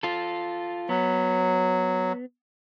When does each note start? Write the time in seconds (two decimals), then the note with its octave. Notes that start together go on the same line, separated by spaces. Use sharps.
0.03 F4 A4
0.89 F#3 B3